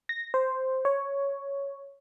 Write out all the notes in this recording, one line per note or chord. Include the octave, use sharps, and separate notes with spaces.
A#6
C5
C#5